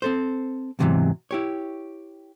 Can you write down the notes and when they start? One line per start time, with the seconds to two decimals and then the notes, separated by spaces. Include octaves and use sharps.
0.02 C4 A4 C5
0.79 E2 G#2 C3 D#3 E3 F#3
1.31 E4 G4 C#5